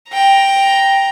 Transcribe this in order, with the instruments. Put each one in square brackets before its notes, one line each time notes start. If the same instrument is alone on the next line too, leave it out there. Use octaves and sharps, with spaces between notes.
[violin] G5 A#5